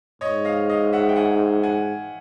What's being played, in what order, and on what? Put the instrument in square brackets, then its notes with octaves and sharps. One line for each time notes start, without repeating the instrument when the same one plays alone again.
[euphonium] G#2 [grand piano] C#5 D#5
[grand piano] D#5 F5
D#5 F5
E5 F#5
G5
F#5 G#5
F#5 G#5